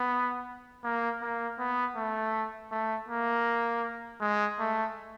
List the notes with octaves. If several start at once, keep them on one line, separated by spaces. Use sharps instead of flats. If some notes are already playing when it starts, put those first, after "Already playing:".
Already playing: B3
A#3
A#3
B3
A3
A3
A#3
G#3
A3